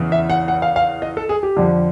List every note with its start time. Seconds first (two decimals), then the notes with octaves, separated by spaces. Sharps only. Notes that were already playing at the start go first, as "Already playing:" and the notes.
Already playing: E2 C#3 E3
0.12 E5
0.30 F#5
0.48 F#5
0.62 F5
0.76 F5
1.02 D#5
1.17 A4
1.29 G#4
1.43 G4
1.57 F2 D3